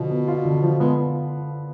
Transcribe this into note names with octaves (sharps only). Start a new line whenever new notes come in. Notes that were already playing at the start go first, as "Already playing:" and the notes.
Already playing: B2 D3 F3
B3
F4
D3
F3
G#3 B3